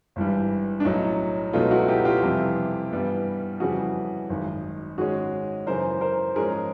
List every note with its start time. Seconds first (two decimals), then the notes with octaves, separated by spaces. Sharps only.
0.16 G#1 G2 E3 G3
0.80 D4
0.85 B1 A2 F#3 C#4 D#4
1.53 C#2 B2 F#3 A3 D#4 F4
1.71 E4 F#4
1.88 F4 G4
2.05 F4 G4
2.23 F2 C3 E3 G3
2.91 G2 E3 G3 B3
3.60 F2 C#3 E3 G3 F#4 G#4
4.29 G#1 F#2 D#3
4.98 G#2 D#3 G#3 C#4 F#4 G#4
5.67 F#2 C#3 E3 A#4 C5
6.01 A#4 C5
6.36 G#2 F3 G#3 C#4 G#4 A#4